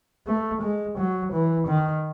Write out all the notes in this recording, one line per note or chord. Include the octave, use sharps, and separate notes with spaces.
A3
G#3
F#3
E3
D#3